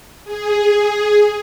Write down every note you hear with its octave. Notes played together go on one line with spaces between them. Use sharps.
G#4